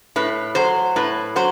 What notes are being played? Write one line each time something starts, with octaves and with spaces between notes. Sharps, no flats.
A2 B4
F#3 C5
A2 B4
F#3 C5